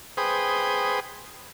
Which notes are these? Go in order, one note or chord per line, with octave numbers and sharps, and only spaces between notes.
G#4 B4 C5 G5 D#6